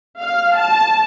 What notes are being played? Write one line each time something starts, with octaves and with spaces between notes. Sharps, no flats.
F5
A5